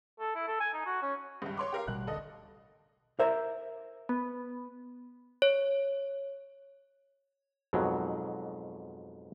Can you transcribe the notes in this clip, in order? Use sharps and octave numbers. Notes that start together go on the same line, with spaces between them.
A4
E4
A4
G#5
D#4
F#4
C#4
C#2 G2
C#5 C6 D6
G4 A#4 F5
A1 B2 G3 F#6
D1 D3 A4 D#5
A#4 C5 E5
B3
C#5
F2 G#2 B2 F#3